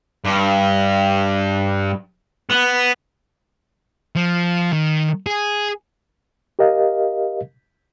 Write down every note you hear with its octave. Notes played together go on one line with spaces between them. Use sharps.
G2
B3
F3
D#3
G#4
G4 A#4 D#5 F5